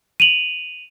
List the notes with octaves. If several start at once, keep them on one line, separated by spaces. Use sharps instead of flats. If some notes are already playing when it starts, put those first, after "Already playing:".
D#7 F7 F#7